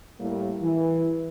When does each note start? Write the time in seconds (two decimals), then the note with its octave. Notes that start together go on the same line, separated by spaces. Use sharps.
0.19 A2 G3 A#3
0.62 E3